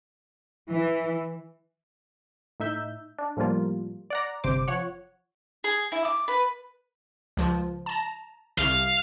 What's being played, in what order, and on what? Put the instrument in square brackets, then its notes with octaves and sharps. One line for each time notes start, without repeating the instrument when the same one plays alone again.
[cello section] E3
[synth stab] A2 D#4 E5 G6
D4
A2 F3 G3 A#3 F4
D5 F#5 A#5
G1 C3 C5 D6
F3 C#5 F#5
[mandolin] G#4
E4
D6
B4
[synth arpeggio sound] C#2 F3 F4
A5 A#5
[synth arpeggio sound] C2 C3 [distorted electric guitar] F5